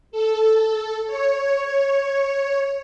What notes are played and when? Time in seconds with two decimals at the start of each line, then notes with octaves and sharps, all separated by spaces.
0.11 A4
1.07 C#5